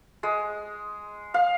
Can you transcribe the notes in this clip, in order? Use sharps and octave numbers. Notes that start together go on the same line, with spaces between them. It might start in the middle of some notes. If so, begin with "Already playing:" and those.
G#3
F5